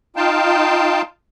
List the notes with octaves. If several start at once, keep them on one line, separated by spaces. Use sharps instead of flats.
D#4 F4 F5 G5 A5